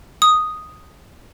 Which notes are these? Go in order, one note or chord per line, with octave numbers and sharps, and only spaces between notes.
D#6